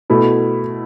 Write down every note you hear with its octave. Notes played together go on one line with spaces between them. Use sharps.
B2 A3 E4